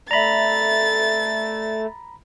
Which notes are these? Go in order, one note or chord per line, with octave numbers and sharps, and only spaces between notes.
A3 D5 E5 A#5 B5 A6